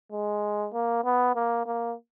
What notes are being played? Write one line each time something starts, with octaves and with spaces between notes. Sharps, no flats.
G#3
A#3
B3
A#3
A#3